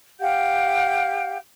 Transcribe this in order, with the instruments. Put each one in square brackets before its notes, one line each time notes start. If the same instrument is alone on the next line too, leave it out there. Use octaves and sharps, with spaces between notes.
[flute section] G4 F5 F#5 G6